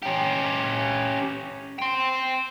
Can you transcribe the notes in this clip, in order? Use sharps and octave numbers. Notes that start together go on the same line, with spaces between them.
C#4 G4
G5 C6